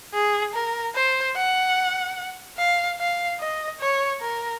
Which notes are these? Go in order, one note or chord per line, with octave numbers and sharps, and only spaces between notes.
G#4
A#4
C5
F#5
F5
F5
D#5
C#5
A#4